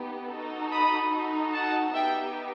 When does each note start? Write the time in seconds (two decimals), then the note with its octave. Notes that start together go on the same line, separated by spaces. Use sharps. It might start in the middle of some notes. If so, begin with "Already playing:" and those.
Already playing: B3 D#4 G4
0.31 D#4 F#4 A4
0.73 B5 D#6
1.13 D#4 F#4 A4
1.54 F#5 A5
1.94 B3 D#4 G4 E5 G5